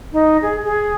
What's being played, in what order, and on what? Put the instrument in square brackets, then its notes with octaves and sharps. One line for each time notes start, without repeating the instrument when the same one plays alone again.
[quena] D#4
G#4
G#4